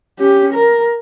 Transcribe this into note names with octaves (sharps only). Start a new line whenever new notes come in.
C#4 G4
A#4